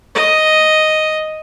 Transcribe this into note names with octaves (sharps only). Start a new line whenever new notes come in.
D#5